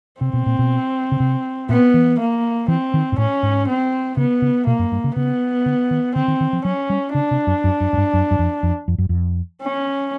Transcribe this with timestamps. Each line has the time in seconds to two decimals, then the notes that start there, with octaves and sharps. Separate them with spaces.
0.21 C3 C4
0.33 B2
0.46 A#2
0.59 B2
1.12 C#3
1.20 C3
1.69 A#2 B3
1.94 E3
2.19 A#3
2.68 E3 C4
2.94 D#3
3.12 G#2
3.18 A2 C#4
3.43 G#2
3.68 C4
4.17 C#3 B3
4.42 C#3
4.66 B2 A#3
4.79 F#2
4.92 G2
5.04 C#3
5.16 C#3 B3
5.66 D3
5.91 D#3
6.15 D3 C4
6.28 D#3
6.40 D#3
6.53 F3
6.65 F#3 C#4
6.90 G3
7.15 C#3 D4
7.31 C3
7.47 F#2
7.64 F#2
7.80 F#2
7.93 F#2
7.97 G2
8.14 F#2
8.31 F#2
8.39 F2
8.63 F2
8.88 F2
8.98 F#2
9.09 F2
9.62 C#4